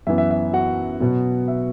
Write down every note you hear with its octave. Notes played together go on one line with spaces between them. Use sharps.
F#2 E3 B3 E5
E5
E5
F#4 F#5
B2 F#3 B3
E5